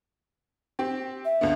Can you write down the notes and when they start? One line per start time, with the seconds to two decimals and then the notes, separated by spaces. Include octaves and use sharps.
0.79 C4 G4
1.25 E5
1.41 C#2 D3 B3